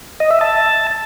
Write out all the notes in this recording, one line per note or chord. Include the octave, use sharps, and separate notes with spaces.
D#5
E5
A5